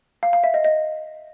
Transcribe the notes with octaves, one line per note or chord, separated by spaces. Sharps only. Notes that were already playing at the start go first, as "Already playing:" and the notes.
F5
F5
E5
D#5
D#5